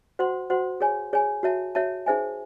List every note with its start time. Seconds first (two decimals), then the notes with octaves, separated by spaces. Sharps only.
0.19 F#4 C5 F#5 C6
0.50 F#4 C5 F#5 C6
0.81 G#4 C#5 G#5
1.13 G#4 C#5 G#5
1.43 F#4 C#5 E5 A5
1.75 F#4 C#5 E5 A5
2.06 D#4 G#4 C5 E5 G#5